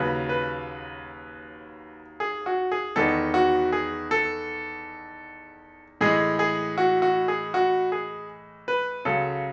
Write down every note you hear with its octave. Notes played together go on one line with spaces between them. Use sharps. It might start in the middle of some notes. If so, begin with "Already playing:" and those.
Already playing: D#2 C#3 F#3 B4
B4
G#4
F#4
G#4
E2 D#3 G#3 B3 A4
F#4
G#4
A4
A2 E3 G#3 G#4
G#4
F#4
F#4
G#4
F#4
G#4
B4
C#2 C#3 F#3 A4